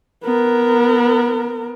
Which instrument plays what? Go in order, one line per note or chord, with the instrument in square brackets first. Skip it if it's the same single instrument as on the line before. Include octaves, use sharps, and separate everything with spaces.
[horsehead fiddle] B3 A#4